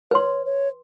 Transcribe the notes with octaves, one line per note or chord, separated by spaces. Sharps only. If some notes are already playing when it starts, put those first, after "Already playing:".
B4 C#5 C6
C#5